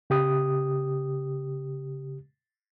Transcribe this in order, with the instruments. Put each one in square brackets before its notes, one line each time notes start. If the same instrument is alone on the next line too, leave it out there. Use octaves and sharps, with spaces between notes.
[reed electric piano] C#3 G4 D#6